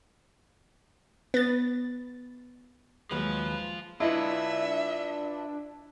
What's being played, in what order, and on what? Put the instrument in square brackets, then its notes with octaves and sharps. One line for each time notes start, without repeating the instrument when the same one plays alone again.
[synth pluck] B3 A6
[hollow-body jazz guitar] D#2 F#3 [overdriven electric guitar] F3 F4 [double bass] G#3 [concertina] B4
[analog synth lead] D4 [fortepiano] E4 D#5 [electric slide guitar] F4 B4 [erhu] E5